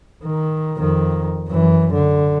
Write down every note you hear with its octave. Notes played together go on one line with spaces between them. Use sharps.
D#3
F2 D#3
F#2 E3
D3